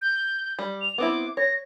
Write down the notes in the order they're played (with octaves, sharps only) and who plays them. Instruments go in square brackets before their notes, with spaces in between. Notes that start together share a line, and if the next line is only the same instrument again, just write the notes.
[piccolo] G6
[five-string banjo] G3
[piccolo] F7
[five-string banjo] B3 C4 E4 [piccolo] D6
[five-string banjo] C#5 [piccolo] A#6